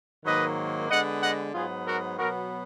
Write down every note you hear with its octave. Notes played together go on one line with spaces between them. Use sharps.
G#2 D#3 F#3 A#3 B4 D#5
D3 G#3 B3 D#5 F#5
D#5 F#5
G#2 F#3 B3 F4 G#4
F#4 A#4
B2 F#3 B3 F#4 A#4